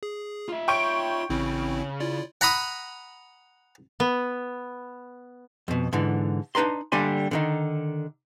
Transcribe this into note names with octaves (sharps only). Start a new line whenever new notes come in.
G#4
F4 E5
C#5 G5 C6 C#6 D7
A1 C#3 C4 E4
E4 F4 D5
F#5 A#5 B5 D#6
B3
F2 B2
G#2 D3 E3
D4 D#4 B4 A#5 C6
D3 G3 A#3 D4 G#5 C6
D3 D#3 D#4